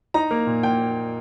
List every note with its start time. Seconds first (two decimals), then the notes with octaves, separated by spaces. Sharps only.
0.14 D#4 A#5
0.31 A#3
0.47 A#2
0.63 A#2 G5